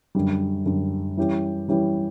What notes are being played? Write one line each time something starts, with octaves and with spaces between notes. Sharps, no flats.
F#2 D3 G3
F#2 D3 G3
E3 G3 C#4 E4 G4
E3 G3 C#4 E4 G4